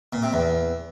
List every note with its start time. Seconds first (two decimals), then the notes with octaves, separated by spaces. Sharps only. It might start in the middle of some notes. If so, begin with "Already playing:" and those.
0.13 A#2
0.23 C3
0.33 E2